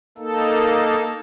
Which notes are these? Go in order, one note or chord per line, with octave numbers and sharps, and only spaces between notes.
A#3 D#4 A4